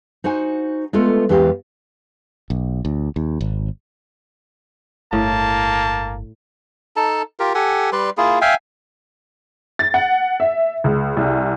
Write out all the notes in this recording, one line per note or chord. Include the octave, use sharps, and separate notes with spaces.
D#4 F#4 C5 F#5 G#5
G#3 A3 B3 F4 A4
E2 E3 G#3 G4 F5
B1
D2
D#2
G#1
G1 A2 A#3 A5
D#4 A4 A5
F4 G4 A#4
G4 A4 F#5 G#5
G3 B4 D5 C6
A#3 E4 F4 G#4
E5 F5 G5 G#5
A6
F#5
E5
C#2
C2